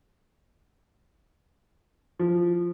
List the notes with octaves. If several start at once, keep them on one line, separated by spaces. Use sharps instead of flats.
F3